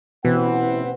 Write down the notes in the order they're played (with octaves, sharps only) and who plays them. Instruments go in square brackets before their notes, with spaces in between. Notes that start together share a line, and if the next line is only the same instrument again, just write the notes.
[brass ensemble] A1 C4 F#5 [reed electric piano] B2 [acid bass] E3 [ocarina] B4